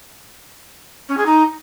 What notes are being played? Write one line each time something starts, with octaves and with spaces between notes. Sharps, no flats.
C#4
G#4
D#4